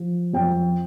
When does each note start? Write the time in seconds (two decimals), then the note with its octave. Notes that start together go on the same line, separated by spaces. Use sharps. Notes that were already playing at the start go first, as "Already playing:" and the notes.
Already playing: F3
0.34 F2 G5